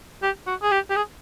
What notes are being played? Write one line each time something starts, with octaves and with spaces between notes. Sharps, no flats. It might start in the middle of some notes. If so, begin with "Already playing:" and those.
G4
F#4
G#4
G4
G4
G#4